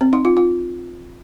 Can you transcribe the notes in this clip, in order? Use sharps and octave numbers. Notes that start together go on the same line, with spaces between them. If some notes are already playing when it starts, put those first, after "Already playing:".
C4
D#4
F4
F4